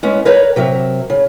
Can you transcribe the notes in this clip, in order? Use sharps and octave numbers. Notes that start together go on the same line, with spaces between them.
G#3 B3 C#4
A#4 B4 C#5 D5 F5 A#5
C3 F#3 A#4 E5
C#3